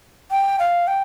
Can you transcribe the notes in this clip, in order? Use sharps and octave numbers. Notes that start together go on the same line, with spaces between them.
G5
F5
G5